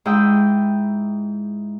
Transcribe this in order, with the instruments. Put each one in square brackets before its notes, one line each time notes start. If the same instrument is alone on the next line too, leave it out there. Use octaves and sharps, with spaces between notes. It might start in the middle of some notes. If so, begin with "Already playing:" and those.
[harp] G#2 E4 D#5 G5 E6